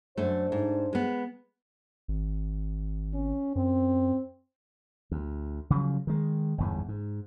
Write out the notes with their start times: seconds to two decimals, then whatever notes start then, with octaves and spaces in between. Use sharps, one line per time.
0.17 F#2 A3 D4 C5
0.52 G#2
0.93 G#3 B3
2.08 G#1
3.14 C#4
3.55 F#2 C4
5.11 D2
5.70 C#3 F3 F#3
6.07 D#3 G#3
6.58 G1 E2 G#2
6.88 G#2